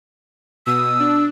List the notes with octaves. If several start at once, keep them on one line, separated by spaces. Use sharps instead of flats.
B2 D#6 E6
D4